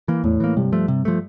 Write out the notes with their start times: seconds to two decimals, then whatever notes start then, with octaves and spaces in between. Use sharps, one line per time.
0.08 E3 A#3
0.23 E2 A2
0.40 E3 A#3
0.56 G2 C3
0.72 F3 A3
0.88 C3
1.05 F3 A3